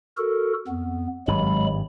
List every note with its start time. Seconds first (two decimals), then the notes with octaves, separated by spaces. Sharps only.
0.17 F#4 A4 A#4
0.68 F2 B3
1.28 G#1 G2 F#3 G#3 B5